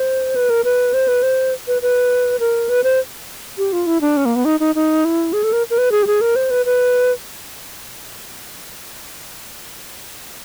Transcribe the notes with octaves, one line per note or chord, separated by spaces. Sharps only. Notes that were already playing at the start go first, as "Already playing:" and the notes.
Already playing: C5
B4
A#4
B4
C5
B4
C5
B4
B4
A#4
B4
C5
G4
F4
E4
D4
C#4
A#3
B3
D#4
D#4
D#4
E4
G#4
A4
A#4
A#4
B4
G#4
G4
G#4
A#4
C5
B4
B4